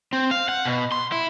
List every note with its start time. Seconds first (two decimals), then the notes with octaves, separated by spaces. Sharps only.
0.13 C4
0.31 F5
0.49 F#5
0.65 B2
0.92 C6
1.12 E4